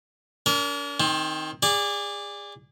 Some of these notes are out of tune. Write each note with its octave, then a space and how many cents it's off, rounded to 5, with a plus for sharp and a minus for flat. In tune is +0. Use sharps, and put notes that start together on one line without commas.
D4 -45 A#4 +0
D#3 +0 C4 +25
G#4 -30 D5 +0